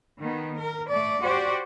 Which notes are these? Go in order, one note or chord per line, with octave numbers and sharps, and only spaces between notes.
D#3 B3
A#4
A3 D5
F#4 G4 C5 D5